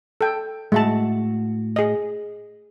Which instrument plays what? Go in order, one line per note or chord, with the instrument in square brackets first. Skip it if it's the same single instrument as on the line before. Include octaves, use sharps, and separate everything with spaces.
[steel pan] A4 G5
[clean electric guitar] A2 F#4 [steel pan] G#3 E5 A5
[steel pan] G#4 D#5